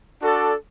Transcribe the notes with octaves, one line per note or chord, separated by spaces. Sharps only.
D4 F#4 A4 D5